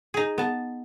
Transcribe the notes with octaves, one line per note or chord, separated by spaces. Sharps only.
D#4 G#4
B3 A5